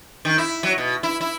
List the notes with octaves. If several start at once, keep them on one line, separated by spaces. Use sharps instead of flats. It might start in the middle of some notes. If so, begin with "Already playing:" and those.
D#3
E4
F#3
B2
E4
E4